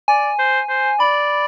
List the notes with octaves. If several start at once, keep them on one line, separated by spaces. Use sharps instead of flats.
D5 G#5
C5
C5
D5 B5